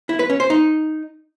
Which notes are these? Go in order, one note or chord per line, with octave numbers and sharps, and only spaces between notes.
E4
B4
C#4
C5
D#4